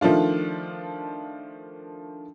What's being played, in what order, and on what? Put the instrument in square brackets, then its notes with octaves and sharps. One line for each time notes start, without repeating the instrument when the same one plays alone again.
[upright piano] D#3 F3 A3 D4 F4